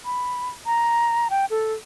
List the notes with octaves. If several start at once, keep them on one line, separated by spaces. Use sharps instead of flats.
B5
A#5
G5
A4